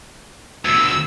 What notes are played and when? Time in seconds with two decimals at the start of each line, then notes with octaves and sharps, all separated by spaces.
0.65 D2 B2 E6